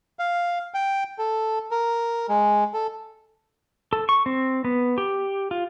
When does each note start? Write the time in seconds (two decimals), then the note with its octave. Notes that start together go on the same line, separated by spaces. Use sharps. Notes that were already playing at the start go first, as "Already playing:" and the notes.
0.19 F5
0.74 G5
1.19 A4
1.71 A#4
2.29 G#3
2.74 A4
3.93 A4
4.09 C#6
4.26 C4
4.65 B3
4.98 G4
5.51 F4